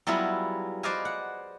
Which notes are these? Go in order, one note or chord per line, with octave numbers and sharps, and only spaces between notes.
F#3 G3 B3 E4 F4 G#4
B4 C5 D5 D#5 F5 G#5
F#5